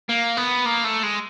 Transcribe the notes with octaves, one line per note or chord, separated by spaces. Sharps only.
A#3
B3
A#3
A3
G#3